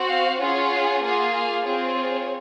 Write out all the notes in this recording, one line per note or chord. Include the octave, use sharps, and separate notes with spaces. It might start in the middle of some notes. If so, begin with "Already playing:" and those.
Already playing: C4 F#4
F5
C#4 F4 G#4 F#5
A#3 F4 G#4
F5
C4 F4 G#4 C#5